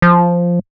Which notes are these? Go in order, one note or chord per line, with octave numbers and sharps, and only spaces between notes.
F3